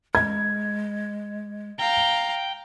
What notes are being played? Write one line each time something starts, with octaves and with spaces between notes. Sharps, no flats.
G#3 G#6
F5 G5 A#5